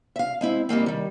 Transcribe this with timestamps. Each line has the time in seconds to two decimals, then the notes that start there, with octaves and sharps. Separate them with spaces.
0.16 E5 F5
0.41 G#3 C4 E4
0.69 G3 G#3 A#3 C4
0.86 D#3 G3